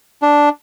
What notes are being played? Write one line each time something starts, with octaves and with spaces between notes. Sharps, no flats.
D4